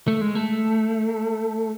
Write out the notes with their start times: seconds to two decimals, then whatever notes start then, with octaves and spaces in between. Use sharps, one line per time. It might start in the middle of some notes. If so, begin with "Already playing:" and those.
0.08 A3
0.21 G#3
0.35 A3